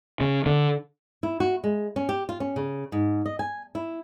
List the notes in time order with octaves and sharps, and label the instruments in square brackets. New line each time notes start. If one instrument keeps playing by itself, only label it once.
[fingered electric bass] C#3
D3
[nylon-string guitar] E4
F#4
G#3
C#4
G4
F4
C#4
C#3
G#2
D#5
G#5
E4